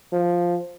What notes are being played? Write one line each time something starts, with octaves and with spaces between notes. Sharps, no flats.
F3